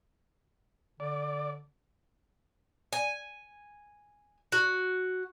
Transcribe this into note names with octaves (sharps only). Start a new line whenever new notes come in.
D3 D5
G#5
F#4